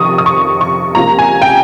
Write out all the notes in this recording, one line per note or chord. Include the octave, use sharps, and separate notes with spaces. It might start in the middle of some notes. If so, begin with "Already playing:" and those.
Already playing: F2 C3 D#3 C#6 D#6
D#6
C#6
C#6
C#2 C3 F3 A#3 A#5
G#5
G5